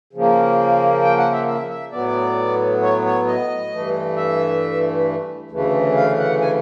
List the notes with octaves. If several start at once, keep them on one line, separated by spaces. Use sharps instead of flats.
C#3 F3 A#3
G5
F#5
E5
E5
E5
A2 F#3 B3 D5
C#5
C#5
D#5
G2 E3 A3
E5
D2 C#3 E3 A3
F5
F#5
G#5